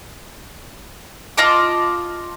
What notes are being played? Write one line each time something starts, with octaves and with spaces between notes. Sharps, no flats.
F4 D#5 A5 D6